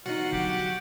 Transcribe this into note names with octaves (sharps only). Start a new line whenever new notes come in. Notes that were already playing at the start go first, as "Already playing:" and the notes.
B1 E2 D#4 F4 F#4 F#5 F#6
D3 F#3 G4